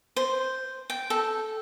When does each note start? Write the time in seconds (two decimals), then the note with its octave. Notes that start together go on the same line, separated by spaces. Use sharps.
0.16 C5
0.90 G5
1.10 A4